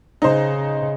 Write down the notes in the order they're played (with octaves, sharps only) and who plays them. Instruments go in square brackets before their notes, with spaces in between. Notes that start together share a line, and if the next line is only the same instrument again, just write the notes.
[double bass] C#3 [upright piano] D#4 C5